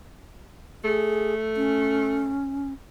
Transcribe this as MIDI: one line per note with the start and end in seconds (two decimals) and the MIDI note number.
0.84 2.35 57
0.84 1.34 68
1.57 2.73 61